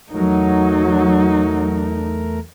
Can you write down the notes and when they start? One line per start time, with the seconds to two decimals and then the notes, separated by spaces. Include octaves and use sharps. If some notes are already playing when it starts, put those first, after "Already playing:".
0.12 E2 F#3 A3 D#4 A#4